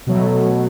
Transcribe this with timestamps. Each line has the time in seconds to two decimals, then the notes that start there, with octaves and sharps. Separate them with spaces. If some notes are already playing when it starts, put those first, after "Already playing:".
0.07 B2 F#3 A3